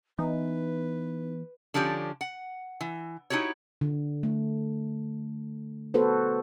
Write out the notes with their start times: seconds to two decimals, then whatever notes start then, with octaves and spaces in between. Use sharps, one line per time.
0.19 E3 B3 D#4 B4
1.74 D3 F3 C#4 G4 D5
2.21 F#5
2.81 E3
3.30 D#4 E4 F#4 G4 C#5
3.81 D3
4.23 A3
5.94 B3 F#4 A4 B4 C5